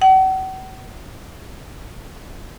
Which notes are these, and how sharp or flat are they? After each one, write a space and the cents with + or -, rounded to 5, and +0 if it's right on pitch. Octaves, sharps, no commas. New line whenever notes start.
F#5 +40